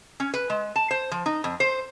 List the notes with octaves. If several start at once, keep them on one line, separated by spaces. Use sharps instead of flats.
C#4
B4
G#3
A5
C5
F3
D#4
F2
C5